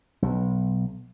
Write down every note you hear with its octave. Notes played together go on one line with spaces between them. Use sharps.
B1